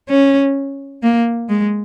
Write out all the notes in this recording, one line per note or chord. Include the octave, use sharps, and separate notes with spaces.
C#4
A#3
G#3